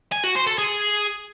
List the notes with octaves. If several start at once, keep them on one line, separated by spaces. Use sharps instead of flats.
G#5
F#4
C5
A4
G#4